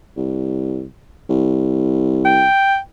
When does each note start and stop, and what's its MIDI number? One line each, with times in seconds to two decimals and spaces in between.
0.17 0.87 36
1.29 2.47 36
2.25 2.78 79